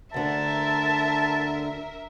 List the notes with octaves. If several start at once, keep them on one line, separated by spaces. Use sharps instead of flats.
D2 D3 A#4 E5 A5